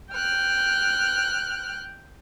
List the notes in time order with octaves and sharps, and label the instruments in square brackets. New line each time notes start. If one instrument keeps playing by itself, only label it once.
[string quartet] G5 F6 F#6